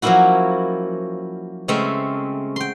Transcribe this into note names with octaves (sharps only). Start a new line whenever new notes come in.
F3 F#3 A#3 C#4 E4 F#4
C#3 G#3 A3 C4 C#4 E5
G5 C6